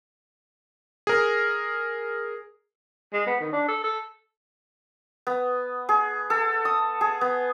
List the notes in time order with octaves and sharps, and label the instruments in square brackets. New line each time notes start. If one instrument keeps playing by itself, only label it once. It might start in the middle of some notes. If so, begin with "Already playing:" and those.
[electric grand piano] G#4 A#4
[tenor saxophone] G#3
B3
D#3
D4
A4
A4
[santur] B3
G#4
A4
D#6
G#4
B3